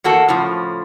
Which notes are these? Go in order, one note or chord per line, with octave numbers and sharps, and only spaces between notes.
E2 A#3 F#4 A4
A2 C#3 F3